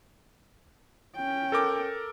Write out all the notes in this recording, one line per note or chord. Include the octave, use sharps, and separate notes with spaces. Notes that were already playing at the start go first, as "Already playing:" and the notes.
C#4 G5
A4 A#4 D6